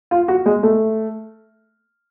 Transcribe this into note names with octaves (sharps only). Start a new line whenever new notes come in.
F4
F#4
G#3
A3